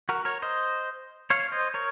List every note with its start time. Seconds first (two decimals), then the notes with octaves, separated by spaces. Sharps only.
0.09 F#4 A#4
0.25 A#4 C#5
0.42 C5 D#5
1.30 C#5 F5
1.52 C5 D#5
1.74 A#4 C#5